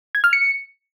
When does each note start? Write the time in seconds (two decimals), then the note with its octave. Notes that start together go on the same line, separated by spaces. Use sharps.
0.15 G#6
0.24 F6
0.33 C#7